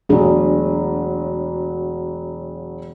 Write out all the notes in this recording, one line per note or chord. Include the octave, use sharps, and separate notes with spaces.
E1 F#3 A3 D4 G#4